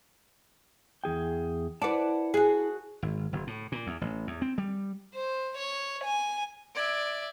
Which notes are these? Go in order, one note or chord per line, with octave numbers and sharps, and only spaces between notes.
E2 G#4 G5
E4 B4 D5 F#5 A5
F#4 G#4
G#1
F#1
A2
A#2
E2
A1
E2
C4
G3
C5
C#5
G#5
D5 E5 G#6 D7